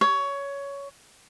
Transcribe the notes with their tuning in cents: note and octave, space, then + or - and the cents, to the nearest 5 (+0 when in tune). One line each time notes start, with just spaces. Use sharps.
C#5 +15